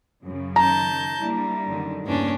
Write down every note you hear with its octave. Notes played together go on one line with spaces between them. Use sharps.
F#2 C#3
D#3 A5 A#5 G6
G3 A#3 D4 E4
F#2 D3 D#3
E2 G2 C#3 A#3 C#4 D4